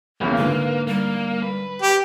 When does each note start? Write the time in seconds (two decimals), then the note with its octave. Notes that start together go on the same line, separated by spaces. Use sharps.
0.21 B1 E2 C#3 A#3
0.38 G#2 D3 B4
0.87 G3 A#3
1.43 B4
1.82 G4